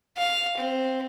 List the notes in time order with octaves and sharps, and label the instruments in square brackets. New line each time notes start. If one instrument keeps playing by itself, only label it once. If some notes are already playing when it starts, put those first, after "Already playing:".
[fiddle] F5
C4